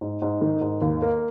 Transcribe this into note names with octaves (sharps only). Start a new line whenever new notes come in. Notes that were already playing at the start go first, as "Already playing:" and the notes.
G#2
G#2
D#3
G#2
D#2
A#3